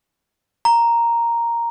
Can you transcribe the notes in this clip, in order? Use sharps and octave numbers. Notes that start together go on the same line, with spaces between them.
A#5